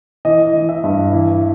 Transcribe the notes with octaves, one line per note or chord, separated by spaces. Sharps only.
E3 D#5
E3
E5
G2
E3